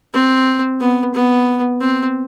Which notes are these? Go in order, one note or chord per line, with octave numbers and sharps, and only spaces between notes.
C4
B3
B3
C4